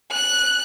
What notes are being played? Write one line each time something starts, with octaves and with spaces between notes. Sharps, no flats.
F#6